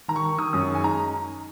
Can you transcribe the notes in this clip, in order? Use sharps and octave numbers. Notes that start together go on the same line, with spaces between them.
D#3 A#5
C#6
D#3
D#3 D#6
F#2 D#6
C#6
G#3
G#5
D#4 A#5